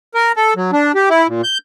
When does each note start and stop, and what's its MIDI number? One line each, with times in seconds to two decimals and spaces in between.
0.15 0.32 70
0.36 0.54 69
0.56 0.71 54
0.72 0.92 62
0.95 1.09 67
1.10 1.27 64
1.28 1.42 46
1.44 1.58 91